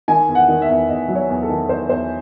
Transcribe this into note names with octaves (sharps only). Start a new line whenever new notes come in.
D#3 G#5
E2
F#5
D#3
E5
E2
E2 D#5
F#3
C#5
E2
A4
D#3
E2 C5
E2 C5